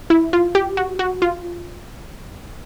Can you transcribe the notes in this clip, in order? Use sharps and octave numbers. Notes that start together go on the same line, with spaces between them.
E4
F4
G4
F#4
F#4
F4